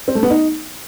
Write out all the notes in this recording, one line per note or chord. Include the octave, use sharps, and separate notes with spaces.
C4
A3
B3
D#4